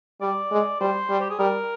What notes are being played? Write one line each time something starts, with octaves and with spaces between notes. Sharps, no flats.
G3 D5
G#3
G3 C5
G3
G4
G#4
G3 A#4